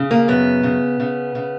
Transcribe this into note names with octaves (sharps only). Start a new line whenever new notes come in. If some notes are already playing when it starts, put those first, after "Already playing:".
Already playing: C#3
A#3
F#2 B3
C#3
C#3
C#3